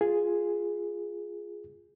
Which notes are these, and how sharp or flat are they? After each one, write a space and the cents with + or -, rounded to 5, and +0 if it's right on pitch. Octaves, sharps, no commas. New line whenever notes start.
F4 +0 G#4 +0